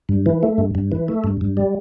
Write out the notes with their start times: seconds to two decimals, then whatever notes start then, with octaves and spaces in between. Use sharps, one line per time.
0.09 G2
0.26 E3
0.43 A3
0.58 G2
0.75 G2
0.92 E3
1.08 A3
1.24 G2
1.41 G2
1.57 G3